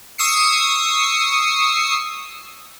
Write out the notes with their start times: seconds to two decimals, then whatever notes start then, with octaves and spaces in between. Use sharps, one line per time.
0.18 C#6 D#6 E6 C7 C#7